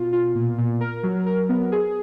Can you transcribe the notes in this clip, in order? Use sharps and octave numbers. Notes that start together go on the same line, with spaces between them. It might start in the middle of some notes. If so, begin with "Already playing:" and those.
Already playing: B2 F4
F4
A#2
A#2
A#4
F#3
A#4
B3
G#4